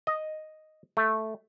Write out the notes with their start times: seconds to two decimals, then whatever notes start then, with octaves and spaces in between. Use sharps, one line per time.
0.07 D#5
0.97 A3